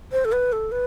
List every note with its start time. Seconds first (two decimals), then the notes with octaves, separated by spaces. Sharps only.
0.12 C5
0.25 A4
0.32 B4
0.52 A4
0.72 B4